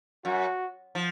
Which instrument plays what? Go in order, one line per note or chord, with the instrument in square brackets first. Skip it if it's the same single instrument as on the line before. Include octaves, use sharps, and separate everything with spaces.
[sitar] F#2 [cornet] F#4
[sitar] F3